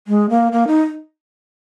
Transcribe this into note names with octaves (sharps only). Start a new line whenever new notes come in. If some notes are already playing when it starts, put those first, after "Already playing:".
G#3
A#3
A#3
D#4